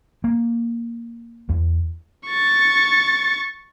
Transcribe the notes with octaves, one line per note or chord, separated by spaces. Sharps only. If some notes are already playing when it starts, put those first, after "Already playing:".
A#3
E2
C#6 A6